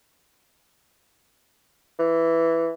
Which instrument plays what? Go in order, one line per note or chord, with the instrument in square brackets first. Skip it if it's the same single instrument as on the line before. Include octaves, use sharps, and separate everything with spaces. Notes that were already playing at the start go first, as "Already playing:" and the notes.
[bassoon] E3